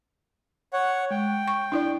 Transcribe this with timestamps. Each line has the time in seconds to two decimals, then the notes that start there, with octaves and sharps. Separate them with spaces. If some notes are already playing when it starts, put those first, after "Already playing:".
0.73 C#5 F#5
1.11 G#3 G5
1.48 C#6
1.72 D4 E4 D5